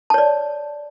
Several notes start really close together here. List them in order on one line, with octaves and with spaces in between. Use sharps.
A5 C#5 D5